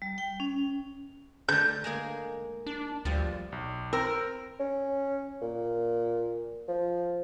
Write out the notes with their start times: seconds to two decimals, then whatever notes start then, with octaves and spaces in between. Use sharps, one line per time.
0.02 G3
0.18 G5
0.40 C#4
1.49 D3 A3 G6
1.84 G#3 A#3 G#4
2.66 D4
3.05 D2 F3 G3
3.52 B1
3.93 C4 A#4 G5 E6
4.60 C#4
5.42 A#2
6.68 F3